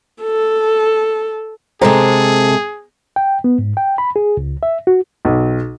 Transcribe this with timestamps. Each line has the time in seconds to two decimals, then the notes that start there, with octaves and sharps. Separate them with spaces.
0.22 A4
1.81 C3 G#3 G#4 A4 C5 A#5
3.16 G5
3.44 B3
3.59 G#2
3.77 G5
3.98 B5
4.16 G#4
4.37 C#2
4.63 E5
4.87 F#4
5.25 B1